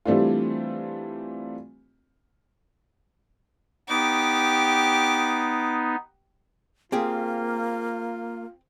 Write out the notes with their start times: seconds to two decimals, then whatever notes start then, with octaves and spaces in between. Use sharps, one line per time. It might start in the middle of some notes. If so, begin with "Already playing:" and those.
0.05 E3 G3 A3 C4 D4 F4
3.89 B3 D#4 G4 D6
6.92 A#3 C4 F4 G4 G#4